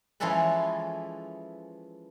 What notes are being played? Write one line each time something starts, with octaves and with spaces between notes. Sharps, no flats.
E3 F3 G#3 C#4 A4 B4